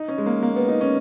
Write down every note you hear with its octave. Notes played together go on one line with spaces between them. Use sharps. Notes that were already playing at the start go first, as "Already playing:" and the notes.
Already playing: D#4
C#4
G#3
A#3
A#3
B3
D#4
C#4